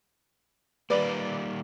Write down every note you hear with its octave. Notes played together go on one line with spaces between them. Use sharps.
D#3 G3 A#3 B4 D5